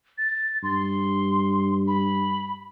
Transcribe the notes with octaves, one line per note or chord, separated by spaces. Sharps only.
A6
G2 C6
B5